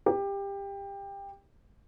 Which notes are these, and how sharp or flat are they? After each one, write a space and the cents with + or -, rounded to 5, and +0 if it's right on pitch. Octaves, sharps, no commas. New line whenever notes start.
G4 +20